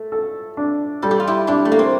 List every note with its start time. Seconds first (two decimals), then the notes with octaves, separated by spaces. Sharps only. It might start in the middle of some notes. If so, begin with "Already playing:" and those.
Already playing: A3
0.12 A4
0.57 D4
1.02 G3 A4
1.11 G4
1.20 F4
1.27 E4 G4
1.47 D4 E4 G4
1.65 A3
1.72 A#3
1.79 C4